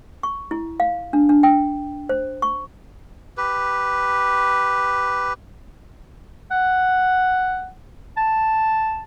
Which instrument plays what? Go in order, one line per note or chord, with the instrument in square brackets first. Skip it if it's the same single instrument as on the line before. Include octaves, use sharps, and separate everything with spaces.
[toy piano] C#6
E4
F5
D4
D4
G5
C5
C#6
[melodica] G4 B4
[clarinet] F#5
A5